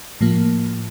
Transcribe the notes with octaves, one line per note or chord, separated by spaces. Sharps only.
A2 F3 A#3